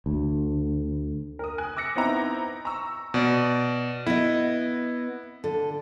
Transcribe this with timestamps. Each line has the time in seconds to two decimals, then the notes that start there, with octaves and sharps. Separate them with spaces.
0.06 D2
1.39 A#4 D#6
1.58 G#5 F#6
1.77 D6 E6 A#6 C#7
1.96 B3 C4 D#4 E4 A#5
2.65 A#5 C#6 E6
3.14 B2 D5
4.06 B3 E4 D#5
5.44 D3